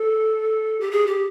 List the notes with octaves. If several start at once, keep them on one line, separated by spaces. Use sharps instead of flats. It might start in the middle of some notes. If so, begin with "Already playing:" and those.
Already playing: A4
G4
G#4
G4